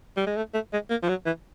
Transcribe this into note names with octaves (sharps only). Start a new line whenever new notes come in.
G3
G#3
A3
A3
G#3
A#3
F3
F#3
E3